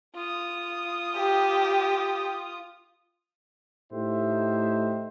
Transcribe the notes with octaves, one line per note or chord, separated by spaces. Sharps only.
F4 D#6
G4
A2 A3 D#4 G4 C5 E5